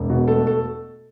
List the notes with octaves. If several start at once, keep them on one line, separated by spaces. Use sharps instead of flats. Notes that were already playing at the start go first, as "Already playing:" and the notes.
Already playing: E1
B2
A3 A4
A4